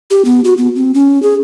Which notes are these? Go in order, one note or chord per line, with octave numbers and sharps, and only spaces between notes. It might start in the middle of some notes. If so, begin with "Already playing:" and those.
G4
B3
F#4
B3
C4
C#4
G#4